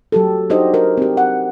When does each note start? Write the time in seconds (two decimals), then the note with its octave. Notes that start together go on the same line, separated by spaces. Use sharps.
0.12 F#3 G4 A4
0.50 D4 D#4 F#4 G4 C5 D#5
0.74 A#4
0.97 C4 G4
1.17 F#5